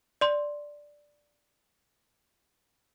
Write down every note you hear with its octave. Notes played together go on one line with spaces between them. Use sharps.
D5 C6